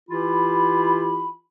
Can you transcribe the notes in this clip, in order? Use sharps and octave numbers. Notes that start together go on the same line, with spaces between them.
E3 E4 F4 G4 B5